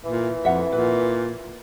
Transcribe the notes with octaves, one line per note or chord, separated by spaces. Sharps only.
A#2 E3
F2 A4 E5 F#5
A#2 B4